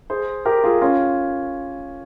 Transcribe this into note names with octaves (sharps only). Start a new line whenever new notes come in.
G#4 C5
G4 A#4
F4 G#4
C#4 F4